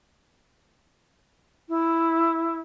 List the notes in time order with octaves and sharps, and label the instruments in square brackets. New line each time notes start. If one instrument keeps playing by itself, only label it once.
[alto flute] E4